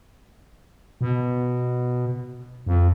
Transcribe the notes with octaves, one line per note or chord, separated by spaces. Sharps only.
B2
F2